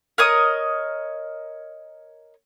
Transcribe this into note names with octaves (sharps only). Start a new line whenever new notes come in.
A#4 C#5 D#5 D#6